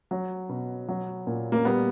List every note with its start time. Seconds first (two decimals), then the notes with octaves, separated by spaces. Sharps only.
0.11 F#3
0.49 B2
0.88 F#3
1.27 A#2
1.52 A#3
1.65 G3 B3